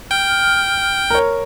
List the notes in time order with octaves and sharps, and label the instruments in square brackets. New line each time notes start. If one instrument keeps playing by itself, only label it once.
[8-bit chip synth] G5 [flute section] F6
[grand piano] A#4 C#5